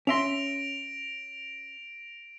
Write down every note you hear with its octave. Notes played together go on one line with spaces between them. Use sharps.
C#4 E5 C6 A#6 D7 F7